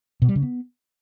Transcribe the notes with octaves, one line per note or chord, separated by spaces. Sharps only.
B2
G3
C#3
B3